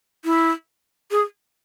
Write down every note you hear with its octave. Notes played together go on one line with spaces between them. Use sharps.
E4
G#4